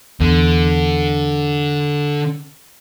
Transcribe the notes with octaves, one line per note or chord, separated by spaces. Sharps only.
E2 D3